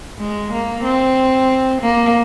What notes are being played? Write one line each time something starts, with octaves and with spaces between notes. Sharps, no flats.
G#3
A#3
C4
A#3